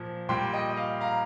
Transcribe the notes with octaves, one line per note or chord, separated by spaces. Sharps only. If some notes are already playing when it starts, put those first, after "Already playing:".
Already playing: A#2 F3
A#2 G3 G5 C6
D#5 G5
D#5
F5
F5 A#5